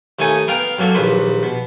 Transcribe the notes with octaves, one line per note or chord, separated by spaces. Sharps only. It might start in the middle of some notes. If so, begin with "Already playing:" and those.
D#2 A3 D#4 G#5 C#6 D#6
B3 A#4 F5 G5 A#5
F#2 F#3 A#3 A4
A#1 D#2 F#4 B4 C6
B2